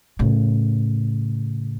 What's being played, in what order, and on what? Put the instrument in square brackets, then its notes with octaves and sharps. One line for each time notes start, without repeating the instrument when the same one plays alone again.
[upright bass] A2 C#3